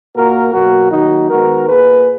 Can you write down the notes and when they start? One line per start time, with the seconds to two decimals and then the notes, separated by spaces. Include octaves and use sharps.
0.14 A#2 A#3 F#4 A#4
0.53 B2 F#3 A#3 F#4 A#4
0.91 D#3 F#3 A#3 D#4 F#4
1.29 D#3 G#3 B3 F#4 A#4
1.68 A#2 A#3 G#4 B4